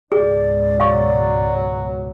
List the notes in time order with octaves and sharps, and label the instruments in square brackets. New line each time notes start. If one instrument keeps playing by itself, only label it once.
[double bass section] C#2 G#2 B2 [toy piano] G#4 [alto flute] D5
[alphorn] F#3 [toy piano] F5 C#6